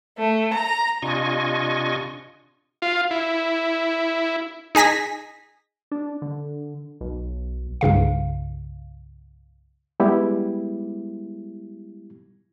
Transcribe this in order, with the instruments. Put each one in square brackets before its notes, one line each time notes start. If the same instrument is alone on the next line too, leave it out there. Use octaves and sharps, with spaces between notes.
[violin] A3
A#5
[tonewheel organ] C3 D4 F4 D#5 G#5 C#6
[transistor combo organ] F4
E4
[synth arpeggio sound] D#4 G#4 G#5 A#6 B6
[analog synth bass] D4
D3
B1
[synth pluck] C2 G2 C#3 F5
[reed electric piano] G3 G#3 B3 E4 G4